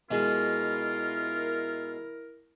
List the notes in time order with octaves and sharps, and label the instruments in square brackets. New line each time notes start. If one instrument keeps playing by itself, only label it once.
[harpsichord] B2 G#3 [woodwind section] E4 A#4 [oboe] F4